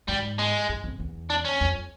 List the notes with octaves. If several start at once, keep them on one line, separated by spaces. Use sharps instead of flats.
G#2 G3
G#3
G2
F2
E2
D4
C#4
F2